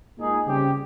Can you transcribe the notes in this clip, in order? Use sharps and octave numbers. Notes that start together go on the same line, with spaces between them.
A#2 G#3 D#4 G#4
C#3 G3 C4 G4